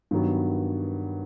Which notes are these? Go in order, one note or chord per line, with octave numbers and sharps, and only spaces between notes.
G2 D#3 F#3 B3